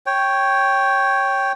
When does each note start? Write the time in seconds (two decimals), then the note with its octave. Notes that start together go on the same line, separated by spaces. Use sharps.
0.06 C#5 G5